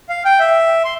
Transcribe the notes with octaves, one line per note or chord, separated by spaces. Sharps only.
F5
G5
E5
C6